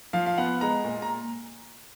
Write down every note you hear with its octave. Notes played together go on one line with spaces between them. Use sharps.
F3 F5
F5
B3 F#5
G#3 A#5
A#2
A#5